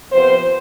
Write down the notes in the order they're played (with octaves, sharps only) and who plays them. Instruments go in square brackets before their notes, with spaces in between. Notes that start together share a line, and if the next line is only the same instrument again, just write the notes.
[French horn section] C3 F3 B3 C5